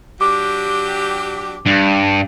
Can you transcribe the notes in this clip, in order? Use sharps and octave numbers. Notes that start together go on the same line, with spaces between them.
F#3 D4 G4 D6
G2